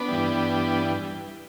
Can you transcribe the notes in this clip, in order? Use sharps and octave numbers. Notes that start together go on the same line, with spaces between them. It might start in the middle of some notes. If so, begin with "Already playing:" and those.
Already playing: B3 D4
G2 E3 G3